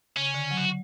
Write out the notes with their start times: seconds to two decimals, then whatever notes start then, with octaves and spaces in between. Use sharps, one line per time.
0.17 C#3 C#4
0.34 D3
0.51 F#3
0.58 F#4